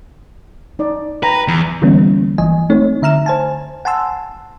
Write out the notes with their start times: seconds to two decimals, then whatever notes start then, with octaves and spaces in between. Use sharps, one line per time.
0.79 D#4 D5
1.23 B4 G5 A#5 B5
1.48 E2
1.82 D3 E3 G3 A#3 B3 C#4
2.38 G1 E3 D#5 G#5
2.70 A3 C4 D#4 C#5
3.02 D3 E5 A#5 F6 E7
3.26 C5 G#5 A5
3.85 F#5 G#5 A5 C6 E6